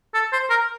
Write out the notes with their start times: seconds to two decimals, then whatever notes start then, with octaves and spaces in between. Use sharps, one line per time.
0.14 A4
0.33 C5
0.50 A#4